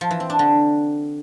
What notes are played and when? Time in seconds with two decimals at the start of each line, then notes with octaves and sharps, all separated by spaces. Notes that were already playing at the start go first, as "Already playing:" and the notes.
0.01 F3
0.11 E3
0.20 C4
0.30 D4
0.39 D3